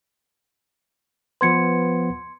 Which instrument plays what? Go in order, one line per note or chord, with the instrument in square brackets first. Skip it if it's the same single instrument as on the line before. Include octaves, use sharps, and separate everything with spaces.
[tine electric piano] F3 B3 B4 [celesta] C6 G#6 C#7